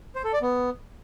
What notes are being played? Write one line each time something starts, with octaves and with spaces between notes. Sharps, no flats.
C5
A4
D5
B3